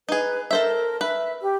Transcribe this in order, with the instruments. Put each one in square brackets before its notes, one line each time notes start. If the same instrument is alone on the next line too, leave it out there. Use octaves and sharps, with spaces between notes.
[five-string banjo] D#4 G#4 [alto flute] B4
[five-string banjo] A4 C5 E5 [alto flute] A#4
[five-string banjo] B4 [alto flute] E5
[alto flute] G4